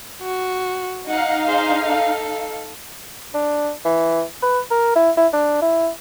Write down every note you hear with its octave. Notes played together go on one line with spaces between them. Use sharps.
F#4
D#4 F5 F#5
G#4 C5
A4
D4
E3
B4
A#4
E4
E4
D4
E4